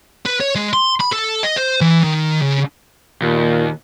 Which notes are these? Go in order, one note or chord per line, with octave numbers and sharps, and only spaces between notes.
B4
C#5
G#3
C6
B5
A4
D#5
C5
E3
D#3
C#3
D#2 A#2